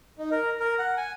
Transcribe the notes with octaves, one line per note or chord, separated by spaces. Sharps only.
D#4
A#4
A#4
F#5
G#5